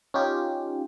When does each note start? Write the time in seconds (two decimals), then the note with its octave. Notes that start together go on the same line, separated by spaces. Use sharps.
0.14 C#4 D#4 F4 G4